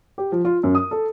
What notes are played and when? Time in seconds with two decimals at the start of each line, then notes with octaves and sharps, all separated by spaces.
0.18 G4
0.32 F3
0.45 F4
0.63 F#2
0.75 D#6
0.91 A4